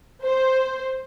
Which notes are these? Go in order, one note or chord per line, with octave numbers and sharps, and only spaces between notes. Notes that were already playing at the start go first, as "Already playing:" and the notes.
C5